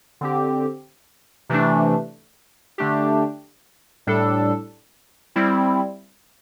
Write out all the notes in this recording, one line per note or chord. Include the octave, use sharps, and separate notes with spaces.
D3 C4 G4
C3 E3 A3 D4
D3 A3 D4 G4
A2 G3 D4 A4
G3 C4 E4